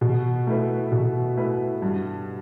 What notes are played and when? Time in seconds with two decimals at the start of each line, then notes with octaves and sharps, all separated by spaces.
0.01 B2
0.47 A3 E4 B4
0.92 B2
1.37 A3 E4 B4
1.82 G2